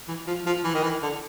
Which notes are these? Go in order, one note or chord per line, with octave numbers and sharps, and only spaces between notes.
E3
F3
F3
E3
D#3
E3
D3